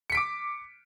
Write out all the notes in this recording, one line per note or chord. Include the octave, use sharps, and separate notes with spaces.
D6 B6 C#7 D7